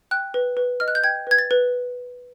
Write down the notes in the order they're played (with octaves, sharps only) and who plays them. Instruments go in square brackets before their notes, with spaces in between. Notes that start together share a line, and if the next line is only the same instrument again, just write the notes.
[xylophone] G5 F#6
B4
B4
D#5 F6
F#6
G6
G5 G#6
B4 G#6
A6
B4